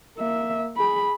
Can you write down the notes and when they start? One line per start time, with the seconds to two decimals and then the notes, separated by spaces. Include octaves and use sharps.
0.18 A#3 E5
0.77 G#4 B5